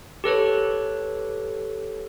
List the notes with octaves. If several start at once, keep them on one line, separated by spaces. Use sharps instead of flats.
G4 A4 B4 C#5